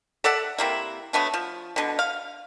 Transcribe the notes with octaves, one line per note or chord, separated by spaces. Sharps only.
A4 D5 E5 F#5
C3 A#3 E4
F#3 A3 B3 D4
F3
B2 D3
F5